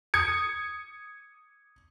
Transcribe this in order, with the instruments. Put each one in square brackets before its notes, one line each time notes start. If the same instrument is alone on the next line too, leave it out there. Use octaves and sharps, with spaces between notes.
[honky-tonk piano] D#6 G#6 C#7